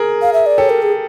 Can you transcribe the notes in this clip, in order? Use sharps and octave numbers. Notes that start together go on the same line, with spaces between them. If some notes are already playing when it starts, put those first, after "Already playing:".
Already playing: G#4 A#4
F5
E5
D5
G4 A4 C#5
A#4
G#4